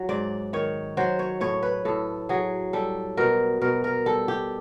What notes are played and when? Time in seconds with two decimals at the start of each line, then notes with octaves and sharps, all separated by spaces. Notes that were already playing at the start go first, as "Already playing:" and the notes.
Already playing: F#3
0.09 G#2 D5
0.53 D#3 C#5
0.97 F#3 C5
1.19 C#5
1.41 A2 C#5
1.63 B4
1.85 A2 A4
2.29 F#3 G#4
2.73 G3 A4
3.17 B2 A#4
3.61 B2 A#4
3.84 A#4
4.06 G3 A4
4.28 G4